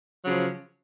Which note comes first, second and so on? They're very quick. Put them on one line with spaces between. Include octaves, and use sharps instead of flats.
F#3 C#3 F3